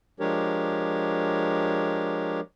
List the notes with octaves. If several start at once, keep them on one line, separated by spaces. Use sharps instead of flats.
F3 G#3 D4 G4 A#4 C#5